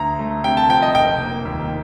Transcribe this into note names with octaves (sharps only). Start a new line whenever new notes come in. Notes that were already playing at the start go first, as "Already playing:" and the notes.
Already playing: D2 A#5
A3
C3 G5
A5
F3 G5
D#5
F1 G5
A#3
D#2